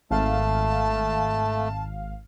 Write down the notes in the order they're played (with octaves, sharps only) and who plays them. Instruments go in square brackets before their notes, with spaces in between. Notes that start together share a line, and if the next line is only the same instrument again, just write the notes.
[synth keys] G#1 F5 [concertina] A3 [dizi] A5